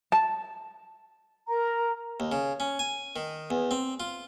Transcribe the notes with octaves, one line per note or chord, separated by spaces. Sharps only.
A5
A#4 A#5
D#2
C#3
C#4
G#5
D#3
E2
C4
F4